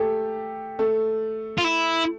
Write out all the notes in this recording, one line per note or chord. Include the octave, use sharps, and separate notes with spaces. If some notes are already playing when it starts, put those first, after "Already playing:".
Already playing: A3 G4 A4
A3 A4
F4
E4